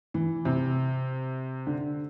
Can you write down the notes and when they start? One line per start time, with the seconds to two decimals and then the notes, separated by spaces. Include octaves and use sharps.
0.14 E3
0.45 C3
1.67 D3